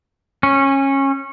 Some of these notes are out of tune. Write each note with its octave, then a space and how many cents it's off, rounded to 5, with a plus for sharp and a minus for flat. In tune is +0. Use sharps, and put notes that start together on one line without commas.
C#4 -20